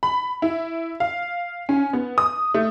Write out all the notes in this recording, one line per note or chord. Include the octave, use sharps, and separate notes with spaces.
B5
E4
F5
C#4
B3
D#6
A3